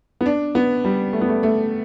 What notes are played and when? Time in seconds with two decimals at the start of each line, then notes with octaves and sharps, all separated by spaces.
0.21 B3
0.26 D4
0.55 B3
0.85 G3
1.13 A3
1.21 B3
1.29 A3
1.43 A3